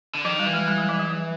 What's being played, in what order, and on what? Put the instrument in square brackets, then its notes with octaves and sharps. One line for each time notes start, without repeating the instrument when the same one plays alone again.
[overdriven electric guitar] D3
[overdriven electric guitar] D#3 [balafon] F3
[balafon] G3
[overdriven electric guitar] E3
[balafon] G#3
G3
F#3
F3
F#3
F#3